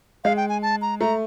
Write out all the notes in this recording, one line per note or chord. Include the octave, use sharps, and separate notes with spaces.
G#3 F5
G5
G#5
A5
A#5
A3 A#5